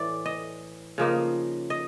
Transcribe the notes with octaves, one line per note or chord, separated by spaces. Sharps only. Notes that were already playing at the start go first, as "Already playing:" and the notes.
Already playing: A2 E3 D5
D#5
C#3 F3 A#3 D#4
D#5